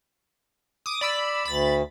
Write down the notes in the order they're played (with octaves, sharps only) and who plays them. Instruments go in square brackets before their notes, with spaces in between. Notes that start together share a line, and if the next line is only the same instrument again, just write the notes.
[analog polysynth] D6 D#6
D5 B5 E6
[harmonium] D2 [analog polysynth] B5 A6